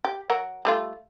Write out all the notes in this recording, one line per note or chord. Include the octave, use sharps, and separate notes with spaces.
G4
F#3 F#4 A#4
G3 A3 F4